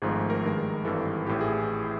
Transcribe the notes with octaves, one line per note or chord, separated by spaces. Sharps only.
G#1 G#2 F3 A3 G#4
A#4
G2 D#3 G#3
G#1 G2 E3 A4
A1 A2 E3 G4
G#4